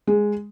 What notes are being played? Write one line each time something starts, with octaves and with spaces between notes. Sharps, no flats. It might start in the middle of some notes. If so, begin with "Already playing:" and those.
G#3